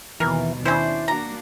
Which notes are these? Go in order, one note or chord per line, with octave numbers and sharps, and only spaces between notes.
D#2 B2 D#3 E3 A#4
C#4 D4 E4 C5
A#3 D4 F#4 A#5